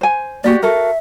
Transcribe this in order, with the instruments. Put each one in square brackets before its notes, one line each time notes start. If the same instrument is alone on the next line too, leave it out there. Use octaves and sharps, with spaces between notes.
[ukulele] C5 G#5
[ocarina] A#3 [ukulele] F#4 G4 D5
[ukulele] F#4 A4 A#4 [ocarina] E5